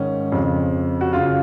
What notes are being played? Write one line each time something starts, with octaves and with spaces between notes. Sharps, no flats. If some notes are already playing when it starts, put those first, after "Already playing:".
Already playing: G#2 D#3 C#4
F2 C#3
F#4
F#2 C#3 F4